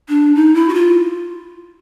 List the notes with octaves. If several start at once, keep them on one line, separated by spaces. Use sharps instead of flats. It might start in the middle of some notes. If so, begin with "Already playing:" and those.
D4
D#4
E4
F#4
F4